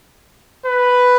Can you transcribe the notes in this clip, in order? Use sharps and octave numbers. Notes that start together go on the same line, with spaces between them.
B4